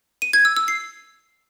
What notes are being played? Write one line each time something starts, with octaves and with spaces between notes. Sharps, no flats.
D#7
G#6
E6
E6
C7